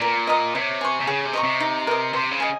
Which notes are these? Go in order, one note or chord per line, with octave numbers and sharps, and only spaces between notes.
A#2 A#4
D#5 A#5 D#6
C3 C#5
G#5 C#6
C3
C#3 G#4
C3
D#5 A#5 C#6
C3
D#4
A#4 D#5
C3 C5
C#3
D#5 G#5